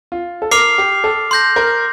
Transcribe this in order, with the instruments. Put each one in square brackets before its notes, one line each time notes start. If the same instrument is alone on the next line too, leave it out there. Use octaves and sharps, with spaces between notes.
[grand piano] F4
A4
[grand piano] A#4 [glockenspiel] D6 F6 C7 F7
[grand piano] G4
A4
[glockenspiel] C6 G6 A#6
[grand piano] A#4